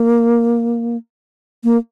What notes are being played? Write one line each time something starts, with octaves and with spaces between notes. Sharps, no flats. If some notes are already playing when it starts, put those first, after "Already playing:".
Already playing: A#3
A#3